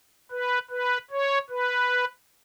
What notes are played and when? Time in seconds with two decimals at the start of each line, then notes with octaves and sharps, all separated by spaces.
0.31 B4
0.70 B4
1.11 C#5
1.50 B4